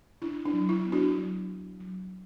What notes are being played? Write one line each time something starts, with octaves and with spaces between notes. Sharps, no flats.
D4 E4
D4
F#3
E4
B3
D4 F#4
F#3
D4
F#3